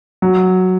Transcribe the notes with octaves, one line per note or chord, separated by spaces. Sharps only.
F#3